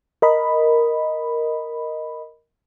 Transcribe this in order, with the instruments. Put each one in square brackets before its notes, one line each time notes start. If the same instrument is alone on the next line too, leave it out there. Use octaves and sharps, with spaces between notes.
[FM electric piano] A#4 D#5 B5